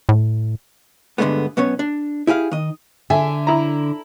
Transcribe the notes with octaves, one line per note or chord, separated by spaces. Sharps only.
A2
G2 D3 D#3 G#3 A3 B3
B1 B3 C#4 C#5
D4
E4 G4 G#4 F5
D#3 D#5
D3 E5 G#5
E4 A#5